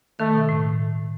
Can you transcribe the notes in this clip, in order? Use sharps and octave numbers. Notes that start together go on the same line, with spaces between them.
D#3 A3
B2
A2